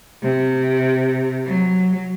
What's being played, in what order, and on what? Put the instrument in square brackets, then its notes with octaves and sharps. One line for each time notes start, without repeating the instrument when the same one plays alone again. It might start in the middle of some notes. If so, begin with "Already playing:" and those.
[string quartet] C3
F#3